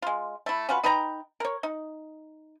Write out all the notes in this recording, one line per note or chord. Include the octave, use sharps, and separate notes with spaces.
G#3 F4
A3 E4
C#4 F4 F#4 B4
D#4 B4 G5 A#5
A#4 C#5
D#4